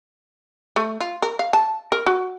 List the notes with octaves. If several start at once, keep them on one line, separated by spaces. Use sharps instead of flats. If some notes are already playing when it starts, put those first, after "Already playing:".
A3
F4
A#4
F5
A5
A#4
F#4